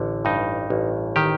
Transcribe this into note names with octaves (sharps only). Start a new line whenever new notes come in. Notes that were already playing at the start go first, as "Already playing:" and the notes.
Already playing: A1 D3
G2 D#4
A1
D#3 G4